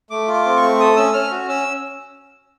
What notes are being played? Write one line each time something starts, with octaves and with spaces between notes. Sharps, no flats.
A3 D6
F4
D6
C4
C#6
A3
A4 D#6
C#4 E6
C#4 F6
F#4
C#4 E6